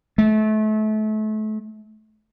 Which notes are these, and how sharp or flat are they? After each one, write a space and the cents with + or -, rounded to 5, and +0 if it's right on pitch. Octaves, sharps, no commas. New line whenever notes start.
A3 -30